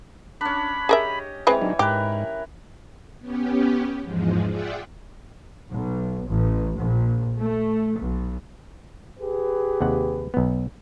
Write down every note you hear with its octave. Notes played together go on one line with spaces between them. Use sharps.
C#4 D4 B5
G4 G#4 A#4 D#5 E5
E3 G#3 C4 B4 C#5
F#3 D4 D#4
G#2 G4 A#4 B4
B3 C#4 G4
E2 G#2 F3 G#3
F4 G#4 D5 E5 F#5 G5
B1
A1
A#1
A3
B1
G4 G#4 B4
D#2 C3 F#5
B1 B3